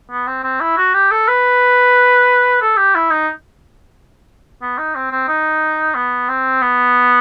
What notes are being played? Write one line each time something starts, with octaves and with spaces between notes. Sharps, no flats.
B3
C4
C4
E4
F#4
G4
A4
B4
A4
G4
E4
D#4
B3
D#4
C4
C4
D#4
B3
C4
B3